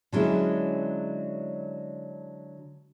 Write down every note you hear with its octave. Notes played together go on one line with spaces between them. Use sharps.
D3 F#3 G#3 C#4 E4